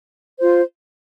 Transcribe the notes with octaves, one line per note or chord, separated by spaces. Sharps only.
F4 C5